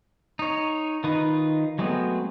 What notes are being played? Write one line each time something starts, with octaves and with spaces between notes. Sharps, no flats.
D#4 C#5
D#3 D#4 F4 B4
F#3 G#3 A3 B3 C4